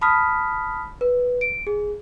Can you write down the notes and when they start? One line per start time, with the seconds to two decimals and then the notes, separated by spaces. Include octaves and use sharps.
0.01 A5 B5 D#6 F6 B6
1.01 B4
1.41 D7
1.67 G#4